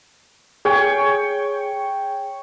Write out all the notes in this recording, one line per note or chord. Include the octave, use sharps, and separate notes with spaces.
G#4 C#5 G5